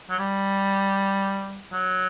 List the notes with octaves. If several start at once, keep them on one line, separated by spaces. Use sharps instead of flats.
F#3
G3
F#3